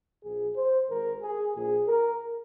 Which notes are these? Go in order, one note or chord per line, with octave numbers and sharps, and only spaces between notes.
A#1 A#2 F3 G#4
C5
G#1 G#2 D#3 A#4
G#4
A#1 A#2 F3 G#4
A#4